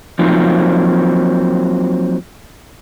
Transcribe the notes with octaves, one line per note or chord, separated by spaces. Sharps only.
F3 F#3 A#3 C4 D#4 F4